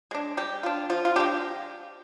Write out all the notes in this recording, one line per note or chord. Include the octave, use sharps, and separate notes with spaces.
G#3 D4
G3 G4
D4 F4
F3 F4
F4
G#3 D4 G4